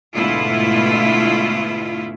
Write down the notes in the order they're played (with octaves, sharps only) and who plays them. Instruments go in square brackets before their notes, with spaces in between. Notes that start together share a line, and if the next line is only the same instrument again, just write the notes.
[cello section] D2 G#2 B2 A3 E4 F4